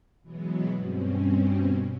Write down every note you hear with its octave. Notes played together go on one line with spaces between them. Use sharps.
B2 E3 F#3 G#3 B3
G2 B2 C4 C#4